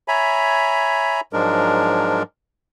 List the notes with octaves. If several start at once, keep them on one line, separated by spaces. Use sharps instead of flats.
C#5 E5 G#5 A#5 B5
G#2 F3 F#3 G#3 D4 A#4